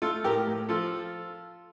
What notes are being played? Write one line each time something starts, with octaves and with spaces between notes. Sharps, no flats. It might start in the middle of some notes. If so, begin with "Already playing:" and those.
A3 F4 A4
A2 G4 A#4
A2
F3 F4 A4